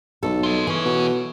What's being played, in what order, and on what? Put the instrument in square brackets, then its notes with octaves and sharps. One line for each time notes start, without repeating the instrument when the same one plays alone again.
[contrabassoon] B1 [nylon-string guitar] A4
[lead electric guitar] F4 D#5
[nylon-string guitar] E3 [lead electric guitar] G#4 C#5
[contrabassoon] B2